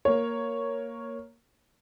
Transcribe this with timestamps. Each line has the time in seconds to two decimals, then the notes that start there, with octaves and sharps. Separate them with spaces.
0.05 A#3 C#5